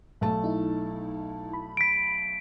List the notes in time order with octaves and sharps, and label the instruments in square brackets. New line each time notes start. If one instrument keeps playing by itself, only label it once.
[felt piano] B1 A3 A5
[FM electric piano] D#4 E4
B5
[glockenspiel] B6 D7